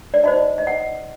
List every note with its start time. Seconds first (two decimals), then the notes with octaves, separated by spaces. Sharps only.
0.14 D5
0.24 D#4 F#4 C5 D#5
0.58 D#5
0.67 F#5